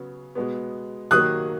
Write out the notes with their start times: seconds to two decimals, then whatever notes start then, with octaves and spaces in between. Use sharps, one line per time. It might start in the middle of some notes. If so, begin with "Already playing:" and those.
Already playing: C#3 F#3 B3
0.35 B2 G#3 B3
1.11 D#3 F#3 A#3 D#6 F#6